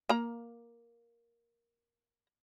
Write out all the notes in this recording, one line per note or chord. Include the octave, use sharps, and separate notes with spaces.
A#3 A#5